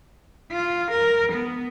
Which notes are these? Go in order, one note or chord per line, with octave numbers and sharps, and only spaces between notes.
F4
A#4
B3